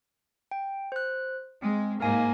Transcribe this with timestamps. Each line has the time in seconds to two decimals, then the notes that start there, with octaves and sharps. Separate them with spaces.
0.51 G5
0.92 C5 F#6
1.62 G#3 C4
2.00 G#2 A#3 A#4 F5 G#5